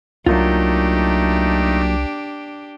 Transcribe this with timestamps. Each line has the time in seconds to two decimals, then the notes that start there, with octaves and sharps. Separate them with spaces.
0.26 C2 F#3 A3 A#3 D4 D#4 F4 G4